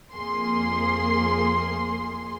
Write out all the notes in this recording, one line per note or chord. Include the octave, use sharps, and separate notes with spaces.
F2 A#3 G#4 C6